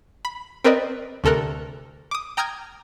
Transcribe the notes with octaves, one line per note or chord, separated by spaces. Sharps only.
B5
C4 A#4 B4 D5 D#5
D2 C3 A4 A#4 F#6
D6 D#6
G5 A#5 D#6 F6 G6 G#6